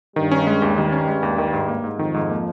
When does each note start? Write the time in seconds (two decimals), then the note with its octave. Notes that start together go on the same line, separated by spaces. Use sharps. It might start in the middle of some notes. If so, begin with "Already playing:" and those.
0.16 G2 D#3 G3
0.31 C#4
0.47 G#3
0.62 D#2
0.77 G2 D#3 G3
0.92 C#4
1.08 G#3
1.23 D#2
1.38 D#3
1.53 G#2
1.68 A#3
1.84 G#2
1.99 F2 D#3 F3
2.14 G#2
2.29 A#3